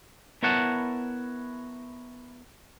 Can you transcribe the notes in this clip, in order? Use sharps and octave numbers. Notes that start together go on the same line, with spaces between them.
B3 E4 A#4 C#5 F#5 A5